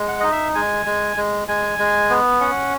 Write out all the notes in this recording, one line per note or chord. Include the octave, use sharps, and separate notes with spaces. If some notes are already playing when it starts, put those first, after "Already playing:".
Already playing: G#3
F#5
D#4 D#5
E5
G#3 G#5
G#3
G#3
G#3 G#5
G#3
B3
C#4 F#5